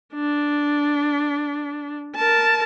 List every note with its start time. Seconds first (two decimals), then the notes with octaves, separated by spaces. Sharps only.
0.15 D4
2.15 A#4 A5